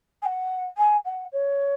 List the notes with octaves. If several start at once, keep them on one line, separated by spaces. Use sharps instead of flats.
G#5
F#5
G#5
F#5
C#5